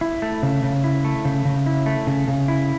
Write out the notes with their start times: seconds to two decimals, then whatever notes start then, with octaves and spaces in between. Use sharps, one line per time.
0.01 E4
0.22 A3
0.43 C#3
0.63 C#3
0.84 E4
1.04 A3
1.25 C#3
1.45 C#3
1.66 E4
1.86 A3
2.07 C#3
2.28 C#3
2.48 E4